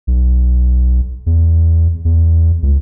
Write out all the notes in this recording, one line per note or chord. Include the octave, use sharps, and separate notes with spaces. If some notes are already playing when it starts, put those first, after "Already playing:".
B1
E2
E2
C#2